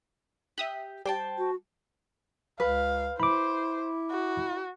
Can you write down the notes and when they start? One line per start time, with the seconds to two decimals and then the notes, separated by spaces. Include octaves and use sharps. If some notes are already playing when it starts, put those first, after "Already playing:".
0.58 G4 E5 D#6 F#6
1.06 G3 G4 C5 G5 A5
1.38 F#4
2.60 C#2 B4 F5
3.20 E4 C5 B5 D6
4.11 F#4